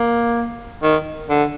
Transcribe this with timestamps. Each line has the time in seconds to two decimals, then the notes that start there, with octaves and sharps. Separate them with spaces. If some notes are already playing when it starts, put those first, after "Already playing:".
Already playing: A#3
0.83 D#3
1.29 D3